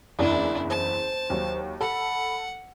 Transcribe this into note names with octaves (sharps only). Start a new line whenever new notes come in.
F#1 E2 E3 D4 E4 D5
C5 A5
D#2 F#3
A4 F#5 B5